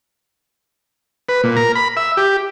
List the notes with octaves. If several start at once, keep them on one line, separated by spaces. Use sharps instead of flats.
B4
A#2
A#4
B5
E5
G4